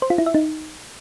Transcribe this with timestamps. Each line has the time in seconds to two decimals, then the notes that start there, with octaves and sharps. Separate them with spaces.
0.02 C5
0.10 F4
0.18 E4
0.26 E5
0.34 D#4